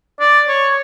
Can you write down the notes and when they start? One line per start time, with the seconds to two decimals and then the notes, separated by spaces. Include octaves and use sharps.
0.20 D5
0.48 C#5